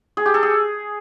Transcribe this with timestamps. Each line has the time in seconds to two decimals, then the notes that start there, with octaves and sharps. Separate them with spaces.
0.17 G#4
0.26 G4
0.34 A4
0.43 G#4